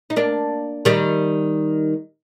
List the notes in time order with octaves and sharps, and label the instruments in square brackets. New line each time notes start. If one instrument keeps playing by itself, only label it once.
[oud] D#4
A#3 D4
D#3 G3